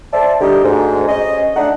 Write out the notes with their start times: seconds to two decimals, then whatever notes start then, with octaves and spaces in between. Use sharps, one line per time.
0.13 C5 D5 E5 A5
0.41 D3 G3 D#4 G4
0.65 D2 G#2
1.09 C#4 D#5
1.56 A3 D4 D#4 F#5